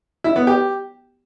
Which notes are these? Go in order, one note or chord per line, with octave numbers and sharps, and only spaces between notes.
E4
B3
G4